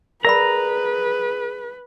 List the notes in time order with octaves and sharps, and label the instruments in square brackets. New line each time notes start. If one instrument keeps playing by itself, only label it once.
[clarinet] G#4 [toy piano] A#4 D5 B5 [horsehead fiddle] B4 [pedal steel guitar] A#5